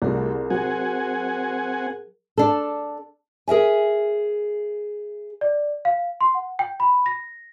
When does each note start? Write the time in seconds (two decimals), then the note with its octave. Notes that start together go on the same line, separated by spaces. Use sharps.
0.02 C2 G3 A3 F4 G#4 A#4
0.50 F#3 C4 F#5 G#5
2.38 D4 A4
3.48 G#4 A#4 E5 G#5
5.41 D5
5.85 F5
6.21 C6
6.35 F#5
6.59 G5
6.80 B5
7.06 A#6